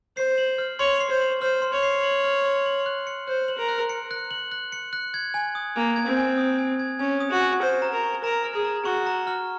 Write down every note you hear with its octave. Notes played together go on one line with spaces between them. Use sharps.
C5 C7
F#7
F6
C#5 C6
C7
C5
F#7
C5 F6
C6
C#5
C7
F#7
F6
C6
F#7
F#6
C#7
C5 F#6
F#7
A#4
F#6
C#7
F#6
F#7
F#6
C#7
F#6
G#6
G#5
D#6
A#3 G#5
G#6
C4
G#5
D#6
G#5
G#6
C#4 G#5
D#6
F#4
G#5
C5 F6
A#5
A#4
C#6
A#4 A#5
F6
G#4
A#5
F#4 C#6
A#5
F6